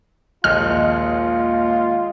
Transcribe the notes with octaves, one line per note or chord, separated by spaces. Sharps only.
A#1 D#2 G#3 F4 F6